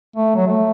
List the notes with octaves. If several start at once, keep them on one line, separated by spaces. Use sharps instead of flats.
A3
F#3
A3